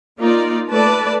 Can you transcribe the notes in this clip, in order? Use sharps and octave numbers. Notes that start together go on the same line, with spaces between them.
A#3 D#4 F4 D5
A3 A4 B4 D5 A5